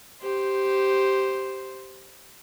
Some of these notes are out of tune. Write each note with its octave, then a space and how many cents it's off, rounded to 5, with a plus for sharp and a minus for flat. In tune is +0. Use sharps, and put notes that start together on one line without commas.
G4 -10 C5 +0